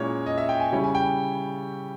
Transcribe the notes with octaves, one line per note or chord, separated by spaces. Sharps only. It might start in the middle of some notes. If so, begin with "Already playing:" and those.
Already playing: A#2 G#3 C#4 E4 C#5
D#5
E5
G5
G#5
C#3 G3 C#4 E4
G#5
G5